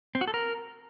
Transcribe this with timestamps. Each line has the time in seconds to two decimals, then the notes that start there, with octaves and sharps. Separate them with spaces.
0.15 C4
0.21 F#4
0.28 A4
0.34 A#4